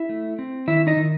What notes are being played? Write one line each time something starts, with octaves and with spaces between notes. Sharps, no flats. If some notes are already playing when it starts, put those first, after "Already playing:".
Already playing: E4 E5
A3
C4
D#3 E4 E5
D#4 D#5
D#3